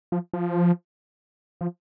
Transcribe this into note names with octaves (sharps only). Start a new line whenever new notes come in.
F3
F3
F3